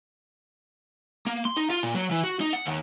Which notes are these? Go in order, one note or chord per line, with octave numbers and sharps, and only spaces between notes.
A#3
C6
D#4
F4
A#2
F#3
E3
F#4
D#4
F#5
D#2